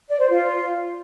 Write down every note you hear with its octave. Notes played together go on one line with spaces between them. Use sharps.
D5
C5
F4